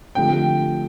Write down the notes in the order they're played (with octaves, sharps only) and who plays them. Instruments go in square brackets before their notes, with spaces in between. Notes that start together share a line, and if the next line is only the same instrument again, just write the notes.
[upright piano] D3 F3 A3 C4 G4 [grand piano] G5